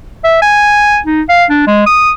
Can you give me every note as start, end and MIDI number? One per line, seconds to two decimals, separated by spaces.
0.24 0.41 76
0.42 0.98 80
1.06 1.22 63
1.29 1.45 77
1.50 1.66 62
1.67 1.84 56
1.87 2.11 87